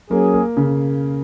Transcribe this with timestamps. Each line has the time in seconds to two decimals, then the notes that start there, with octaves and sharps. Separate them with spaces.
0.11 F#3 A#3 C#4 G#4
0.34 A#3
0.57 C#3